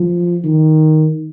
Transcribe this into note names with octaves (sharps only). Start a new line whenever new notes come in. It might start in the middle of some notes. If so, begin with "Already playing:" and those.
Already playing: F3
D#3